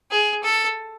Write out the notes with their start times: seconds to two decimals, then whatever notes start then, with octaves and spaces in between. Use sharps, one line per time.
0.11 G#4
0.44 A4